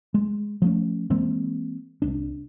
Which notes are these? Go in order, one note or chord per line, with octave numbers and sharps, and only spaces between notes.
G#3
F3 A3 C#4
E3 G#3 A#3 C4
C2 D4